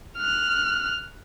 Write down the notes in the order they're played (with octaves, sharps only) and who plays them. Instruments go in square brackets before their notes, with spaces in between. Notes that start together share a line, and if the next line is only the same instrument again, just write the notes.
[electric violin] F6 F#6